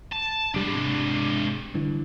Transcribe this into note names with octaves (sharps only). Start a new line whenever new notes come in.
A5
E1 G3 G#3 D4
G#2 C3
G2 D3 E3